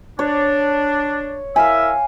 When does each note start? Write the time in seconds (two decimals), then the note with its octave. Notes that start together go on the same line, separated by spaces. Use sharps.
0.19 D4 C#5
1.56 E4 A#4 E5 F5 G#5